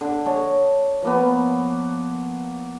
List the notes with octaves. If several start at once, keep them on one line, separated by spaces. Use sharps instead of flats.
D3
A4 C#5 D#5 D6
F3 A#3 B3